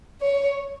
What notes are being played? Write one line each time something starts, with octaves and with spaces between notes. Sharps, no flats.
C#5